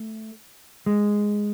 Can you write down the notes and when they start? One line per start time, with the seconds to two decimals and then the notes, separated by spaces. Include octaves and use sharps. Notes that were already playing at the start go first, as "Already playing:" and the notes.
Already playing: A3
0.86 G#3